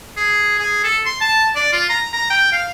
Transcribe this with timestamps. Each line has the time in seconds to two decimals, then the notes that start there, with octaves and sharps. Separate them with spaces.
0.17 G#4
0.59 G#4
0.84 A4
1.06 C6
1.21 A5
1.56 D5
1.73 F4
1.90 A#5
2.13 A#5
2.30 G5
2.53 F5